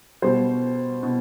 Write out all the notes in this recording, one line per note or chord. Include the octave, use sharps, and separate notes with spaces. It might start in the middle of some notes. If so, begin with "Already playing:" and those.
B2 G3 C5
B2